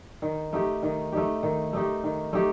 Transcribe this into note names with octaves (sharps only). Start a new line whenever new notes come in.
D#3
A3 D#4 G4
D#3
A3 D#4 G4
D#3
A3 D#4 G4
D#3
A3 D#4 G4